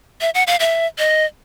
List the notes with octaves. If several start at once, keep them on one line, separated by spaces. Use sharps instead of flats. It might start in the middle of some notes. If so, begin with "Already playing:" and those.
E5
F#5
F5
E5
D#5